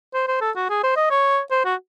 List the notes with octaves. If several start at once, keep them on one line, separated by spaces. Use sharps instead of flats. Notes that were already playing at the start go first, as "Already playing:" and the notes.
C5
C5
A4
F#4
G#4
C5
D#5
C#5
C5
F#4